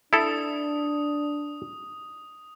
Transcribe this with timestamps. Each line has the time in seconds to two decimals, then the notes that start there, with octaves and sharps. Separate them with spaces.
0.13 D4 E4 A4 D#6